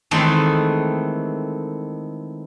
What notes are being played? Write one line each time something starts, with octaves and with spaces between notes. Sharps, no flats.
D#3 E3 G#3 A3 C4 D#4